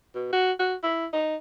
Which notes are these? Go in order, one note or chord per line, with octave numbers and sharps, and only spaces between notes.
B2
F#4
F#4
E4
D#4